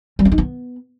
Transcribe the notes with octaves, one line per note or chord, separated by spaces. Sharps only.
G3
C4
D#4
B3